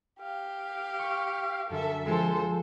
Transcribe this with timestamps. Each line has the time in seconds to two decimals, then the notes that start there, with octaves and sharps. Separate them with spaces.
0.19 G4 F5
0.99 C#6
1.70 F#2 D3 A4 E5
2.06 F3 G#3 C4 A4 C5